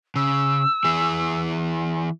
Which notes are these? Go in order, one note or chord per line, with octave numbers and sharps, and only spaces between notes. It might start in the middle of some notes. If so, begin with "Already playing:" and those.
C#3 E6
E3 G#4